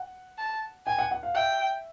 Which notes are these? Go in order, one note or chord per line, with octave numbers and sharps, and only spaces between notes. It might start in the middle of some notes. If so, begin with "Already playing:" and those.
Already playing: F#5
A5
G5 G#5
F#5
F#5
F5
E5 G5